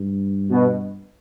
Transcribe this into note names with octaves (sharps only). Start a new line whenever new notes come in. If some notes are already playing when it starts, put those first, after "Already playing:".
Already playing: G2
B2